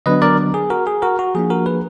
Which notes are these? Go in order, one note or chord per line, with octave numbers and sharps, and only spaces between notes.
D3 F#3 B3 D4 B4 D#5
A#4 D5
G#4
F#4 A#4
G#4
F#4 A#4
F#4
F3 A#3 D4 G#4
F#4 A#4
G#4 B4